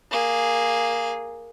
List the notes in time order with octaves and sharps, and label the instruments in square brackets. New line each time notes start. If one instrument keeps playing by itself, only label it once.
[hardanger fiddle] A#3 G#4